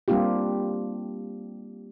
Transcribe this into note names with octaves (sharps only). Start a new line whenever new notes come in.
G3 A#3 C4 D4 F4 G4